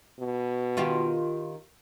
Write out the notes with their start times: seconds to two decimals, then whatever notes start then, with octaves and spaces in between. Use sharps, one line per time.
0.20 B2
0.77 D#3 F4 G4